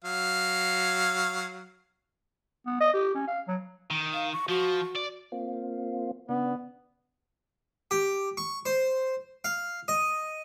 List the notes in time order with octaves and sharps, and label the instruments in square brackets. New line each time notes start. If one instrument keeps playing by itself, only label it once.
[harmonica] F#3 F5
[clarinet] B3
D#5
G4
C#4
F5
F#3
[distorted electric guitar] D#3
[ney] F5
C#6
[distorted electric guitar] F3 [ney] F#4
[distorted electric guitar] D5
[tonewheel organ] A#3 C4 F4
[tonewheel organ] C#3 D4 [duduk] B3
[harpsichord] G4
C#6
C5
F5
D#5